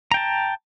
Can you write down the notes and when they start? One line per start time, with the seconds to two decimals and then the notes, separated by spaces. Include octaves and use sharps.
0.12 A#5
0.14 G5
0.17 A5